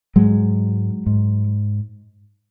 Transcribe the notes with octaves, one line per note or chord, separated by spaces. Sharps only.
G#2 F#3 G#3
G#2